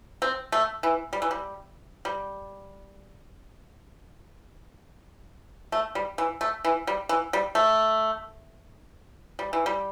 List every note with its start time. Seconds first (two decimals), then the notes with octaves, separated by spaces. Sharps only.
0.22 C4
0.52 A3
0.83 E3
1.13 G3
1.22 E3
1.31 G3
2.05 G3
5.72 A3
5.95 G3
6.18 E3
6.41 A3
6.64 E3
6.87 G3
7.09 E3
7.33 G3
7.55 A3
9.39 G3
9.53 E3
9.66 G3